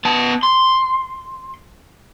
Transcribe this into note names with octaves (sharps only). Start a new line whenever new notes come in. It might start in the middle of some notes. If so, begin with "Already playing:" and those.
B3 A5
C6